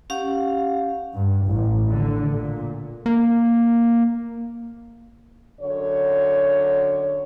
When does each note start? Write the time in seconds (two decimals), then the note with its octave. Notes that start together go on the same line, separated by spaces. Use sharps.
0.10 C#4 G4 F5 F#5
1.15 G2
1.47 A1
1.90 D3
2.32 A#2
3.06 A#3
5.61 F#2 D3 C#5